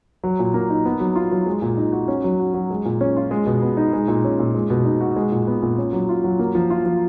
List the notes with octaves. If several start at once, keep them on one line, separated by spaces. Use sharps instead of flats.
F#3
A#2
A#3
D#4
B3
F#3
F4
F#3
G#3
A#2
D#4
F#4
C#4
F#3
F#4
F#3
G#3
A#2
C#4
F4
G#3
B2
B3
D#4
G#3
A#2
C#4
A#2
G#3
B2
D#4
F#4
G#3
A#2
B3
A#2
C#4
F#3
F4
F#3
A#3
F3
F4
F3